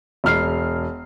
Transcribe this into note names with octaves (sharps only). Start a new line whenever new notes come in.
E1 F6 C7